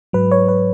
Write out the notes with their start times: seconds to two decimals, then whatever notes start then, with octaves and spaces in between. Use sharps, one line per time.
0.13 G#2 F#3 B4
0.32 C#5
0.49 B4